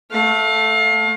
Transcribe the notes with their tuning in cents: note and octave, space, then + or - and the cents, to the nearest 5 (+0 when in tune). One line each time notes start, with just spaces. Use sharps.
A3 +0 F5 +30